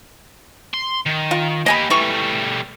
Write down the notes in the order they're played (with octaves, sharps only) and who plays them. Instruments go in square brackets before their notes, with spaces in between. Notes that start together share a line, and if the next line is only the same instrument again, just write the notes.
[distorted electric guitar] C6
D#3
[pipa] F4
[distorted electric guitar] A#3 G4 [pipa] D#5 G#5 B5
[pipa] E3 C#6 [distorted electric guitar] G3 A3